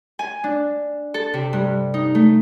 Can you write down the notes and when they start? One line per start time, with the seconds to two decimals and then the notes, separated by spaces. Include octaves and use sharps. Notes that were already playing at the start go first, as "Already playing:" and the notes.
0.19 G#5
0.44 D4
1.14 A4
1.34 C3
1.53 G2
1.94 D#4
2.15 A3